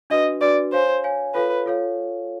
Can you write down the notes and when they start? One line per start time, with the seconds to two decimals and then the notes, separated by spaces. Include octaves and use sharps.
0.10 D4 F#4 B4 D#5
0.41 D4 F#4 B4 D5
0.73 C5 C#5 F5 G#5
1.04 C#5 F5 G#5
1.35 F4 A4 B4 C#5 F5
1.66 F4 A4 C#5 F5